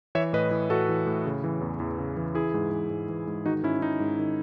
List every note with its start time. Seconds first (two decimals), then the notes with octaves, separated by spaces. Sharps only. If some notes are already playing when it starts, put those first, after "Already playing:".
0.15 E3 C#5 E5
0.33 A2 B4 D#5
0.51 E3
0.69 A2 F#4 A4
0.89 E3
1.07 A2
1.26 C#3
1.44 E3
1.61 E2
1.80 E2
1.98 C#3
2.17 E3
2.35 E3 E4 G#4
2.54 G#2
2.71 E3
2.90 G#2
3.09 E3
3.27 G#2
3.46 D#3 D#4 F#4
3.63 G#2 C#4 E4
3.81 D#3 D#4
4.00 G#2
4.19 D#3